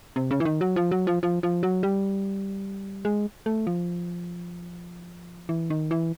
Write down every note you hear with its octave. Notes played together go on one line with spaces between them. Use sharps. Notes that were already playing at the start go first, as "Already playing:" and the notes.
C3
C#3
E3
D#3
F#3
F3
F#3
F3
F3
F3
F#3
G3
G#3
A3
F3
E3
D#3
E3